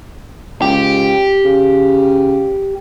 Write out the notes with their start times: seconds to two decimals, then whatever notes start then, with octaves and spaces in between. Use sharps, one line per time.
0.62 C#2 G4
1.45 C#3